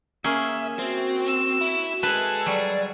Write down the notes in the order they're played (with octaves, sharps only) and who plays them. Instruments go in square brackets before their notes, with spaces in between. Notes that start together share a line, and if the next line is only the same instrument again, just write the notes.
[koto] A#3 C#4 G#4 [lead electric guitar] E5
[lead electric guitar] C4 [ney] F#4
[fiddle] E6
[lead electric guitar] E4
[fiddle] G#3 G#4 [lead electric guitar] A4 [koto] B4
[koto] F#3 G3 [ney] D5